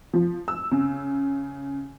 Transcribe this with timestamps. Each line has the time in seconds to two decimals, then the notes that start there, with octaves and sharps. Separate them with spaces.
0.14 F3
0.48 E6
0.72 C#3